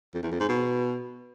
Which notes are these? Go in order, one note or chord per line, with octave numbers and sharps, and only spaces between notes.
F2
E2
F2
G#2
B2